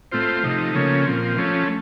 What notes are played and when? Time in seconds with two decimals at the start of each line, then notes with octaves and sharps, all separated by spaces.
0.12 A2 A3 C4 F4 C5
0.43 C3 F3 A3 D#4
0.75 C#3 F3 A#3 C#4 A4
1.06 A#2 F3 C4
1.37 F3 A3 C#4